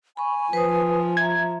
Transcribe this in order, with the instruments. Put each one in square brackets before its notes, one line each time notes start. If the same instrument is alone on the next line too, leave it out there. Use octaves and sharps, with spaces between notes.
[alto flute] G#5 [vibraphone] B5 C#6
[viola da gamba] F3 [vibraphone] B4 C5 D#6
[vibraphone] E5 A#5 [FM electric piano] G#6